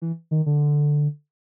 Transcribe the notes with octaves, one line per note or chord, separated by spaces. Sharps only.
E3
D#3
D3